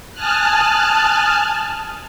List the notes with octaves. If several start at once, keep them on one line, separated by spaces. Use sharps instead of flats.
G#5 A5 D#6 F6 F#6